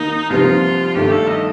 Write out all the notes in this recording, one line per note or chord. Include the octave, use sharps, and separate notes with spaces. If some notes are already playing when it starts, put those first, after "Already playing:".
Already playing: D#2 D#3 A#3 D#4
C2 C3 F3 F4
G1 G2 D#3 A3 G4
A4
D#5